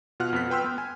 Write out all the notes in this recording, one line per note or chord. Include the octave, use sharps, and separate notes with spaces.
B2 F4 F#5 F6 F#6
F2 B3 B6
B4 G5 C6 E6 F6
B3 G5
G#5